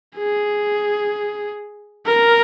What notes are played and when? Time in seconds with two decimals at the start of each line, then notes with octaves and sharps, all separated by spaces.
0.17 G#4
2.06 A#4